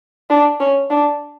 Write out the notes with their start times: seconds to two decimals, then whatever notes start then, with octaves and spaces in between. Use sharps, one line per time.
0.30 D4
0.60 C#4
0.90 D4